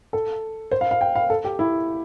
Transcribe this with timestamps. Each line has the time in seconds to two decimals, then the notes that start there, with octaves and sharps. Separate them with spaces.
0.13 A4
0.71 C5
0.81 F5
0.91 F5
1.01 G5
1.15 F5
1.30 A4
1.44 G4
1.59 E4